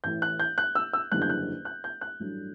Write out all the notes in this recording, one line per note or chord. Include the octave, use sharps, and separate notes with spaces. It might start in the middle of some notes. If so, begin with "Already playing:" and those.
A1 A2 E3 G6
F#6
G6
F#6
E6
E6
F#1 E2 D3 G3 F#6
G6
F#6
F#6
G6
F#6
A1 G2 F#3 A3 D4